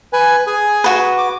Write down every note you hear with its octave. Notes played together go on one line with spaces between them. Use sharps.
B4 G#5
G#4 G#5
F#4 B4
D6